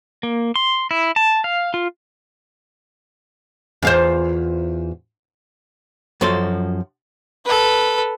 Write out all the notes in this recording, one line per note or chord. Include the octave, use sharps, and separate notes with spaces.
A#3
C6
E4
A5
F5
F4
E2 F4 C5
F#2 F3 F#4 A4 C6
A4 B4